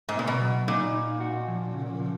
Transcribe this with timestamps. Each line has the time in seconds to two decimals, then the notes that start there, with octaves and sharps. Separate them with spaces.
0.09 G#2
0.15 A#2 B3
0.27 B2
0.41 F#3
0.68 A#2 D#4
0.94 D#4
1.20 F#4
1.48 F3
1.74 C#3
2.01 F3